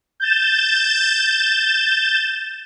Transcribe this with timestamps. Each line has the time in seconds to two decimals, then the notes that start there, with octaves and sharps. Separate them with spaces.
0.20 G6 A6 E7